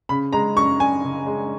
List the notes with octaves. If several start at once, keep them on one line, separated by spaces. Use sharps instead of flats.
C#3 B5
G#3 A#5
F#2 C#6
F#2 G#5
C#3
G#3